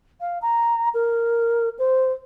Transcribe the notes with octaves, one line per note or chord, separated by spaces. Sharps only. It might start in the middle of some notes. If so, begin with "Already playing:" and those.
F5
A#5
A#4
C5